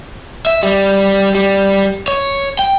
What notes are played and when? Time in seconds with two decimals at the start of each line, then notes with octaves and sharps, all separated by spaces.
0.46 E5
0.63 G3
1.35 G3
2.08 C#5
2.59 G5